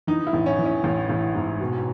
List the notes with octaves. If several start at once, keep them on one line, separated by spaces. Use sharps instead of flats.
E3 D#4
E4
A1
C#4
E3
C#4
A1
A1
G#2
B2